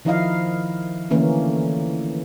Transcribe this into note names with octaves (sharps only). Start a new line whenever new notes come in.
D#3 F3 D#4 E4 D#5 F5
D3 E3 A3 A#3 C#4